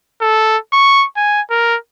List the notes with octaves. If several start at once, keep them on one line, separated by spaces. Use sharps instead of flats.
A4
C#6
G#5
A#4